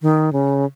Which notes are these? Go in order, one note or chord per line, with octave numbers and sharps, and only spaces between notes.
D#3
C#3